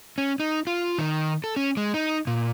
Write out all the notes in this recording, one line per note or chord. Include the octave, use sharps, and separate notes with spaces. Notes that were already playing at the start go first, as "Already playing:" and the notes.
C#4
D#4
F4
D#3
A4
C#4
G#3
D#4
A#2